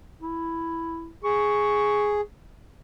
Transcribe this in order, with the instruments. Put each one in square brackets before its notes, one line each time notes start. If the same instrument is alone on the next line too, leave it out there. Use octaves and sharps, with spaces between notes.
[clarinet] E4
[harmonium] G#4 [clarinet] C#6